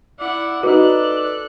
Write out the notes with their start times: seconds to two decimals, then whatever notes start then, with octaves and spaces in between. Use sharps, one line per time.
0.20 E4 D5 F#5
0.63 D#4 F#4 A4 B4 D5 F#6